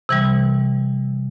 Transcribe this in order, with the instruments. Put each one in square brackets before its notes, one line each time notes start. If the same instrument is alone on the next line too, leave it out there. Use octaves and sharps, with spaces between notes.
[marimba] C3 E3 G3